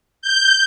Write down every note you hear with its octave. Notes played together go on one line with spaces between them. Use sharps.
G6